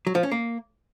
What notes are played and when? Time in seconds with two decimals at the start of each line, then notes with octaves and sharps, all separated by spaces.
0.07 F#3
0.15 F3
0.23 C#4
0.32 A#3